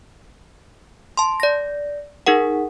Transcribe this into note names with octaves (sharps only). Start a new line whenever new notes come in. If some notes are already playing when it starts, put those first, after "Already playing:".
A5 C6
D5 A#6
D#4 G#4 A#4 F#5